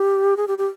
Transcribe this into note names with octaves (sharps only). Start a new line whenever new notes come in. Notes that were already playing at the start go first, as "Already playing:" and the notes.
Already playing: G4
G#4
G4
G4